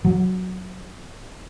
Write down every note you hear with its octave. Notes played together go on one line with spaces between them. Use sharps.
F#3